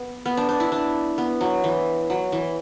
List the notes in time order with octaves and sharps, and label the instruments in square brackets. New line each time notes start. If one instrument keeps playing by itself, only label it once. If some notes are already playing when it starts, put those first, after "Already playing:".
Already playing: [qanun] B3
B3
D4
D4
E4
D4
B3
F#3
E3
F#3
E3